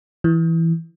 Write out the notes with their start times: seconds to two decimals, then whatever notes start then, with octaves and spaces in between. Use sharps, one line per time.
0.24 E3